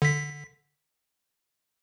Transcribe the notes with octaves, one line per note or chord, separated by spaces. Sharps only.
D3 B6